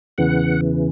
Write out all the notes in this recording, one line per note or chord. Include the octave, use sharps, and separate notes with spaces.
E2 C#3 E3 F#5